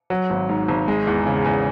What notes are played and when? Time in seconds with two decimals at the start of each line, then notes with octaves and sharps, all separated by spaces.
0.10 F#3
0.30 G#1
0.49 G#2
0.68 G#1
0.88 G#3
1.07 E2
1.26 C#3
1.45 E2